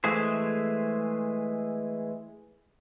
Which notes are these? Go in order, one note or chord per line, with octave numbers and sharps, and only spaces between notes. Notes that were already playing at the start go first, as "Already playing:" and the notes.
E3 G#3 A3 G#4 C5